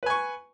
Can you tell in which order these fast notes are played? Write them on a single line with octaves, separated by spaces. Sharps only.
B4 G#5 C#6